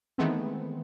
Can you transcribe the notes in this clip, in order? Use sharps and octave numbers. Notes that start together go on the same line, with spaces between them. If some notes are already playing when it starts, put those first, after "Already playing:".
D#3 E3 G#3 A3 B3 C4